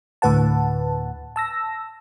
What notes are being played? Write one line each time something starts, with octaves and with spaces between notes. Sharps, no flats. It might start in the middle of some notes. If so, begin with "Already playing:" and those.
D2 A2 D3 B4 F#5 A5
A5 E6 A#6